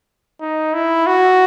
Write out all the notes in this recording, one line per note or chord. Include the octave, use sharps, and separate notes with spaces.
D#4
E4
F#4